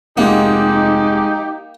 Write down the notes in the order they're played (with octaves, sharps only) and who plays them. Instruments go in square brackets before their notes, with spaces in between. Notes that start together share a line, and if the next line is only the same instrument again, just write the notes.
[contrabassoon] F1 [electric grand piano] G#3 F#5 [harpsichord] A#3 [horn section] D#4 G4